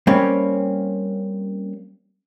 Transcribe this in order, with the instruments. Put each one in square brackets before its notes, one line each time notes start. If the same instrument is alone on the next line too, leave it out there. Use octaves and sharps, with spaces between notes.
[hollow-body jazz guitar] G3 A#3 C4 C#4 C#5